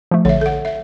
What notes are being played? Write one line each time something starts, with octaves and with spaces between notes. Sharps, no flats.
F3 A3
A#1 D3 C#5 E5
A4 F#5
E5